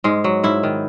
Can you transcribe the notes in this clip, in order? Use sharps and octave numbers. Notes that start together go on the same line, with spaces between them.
G#2 G#3
F#3
G#2 E4
D#3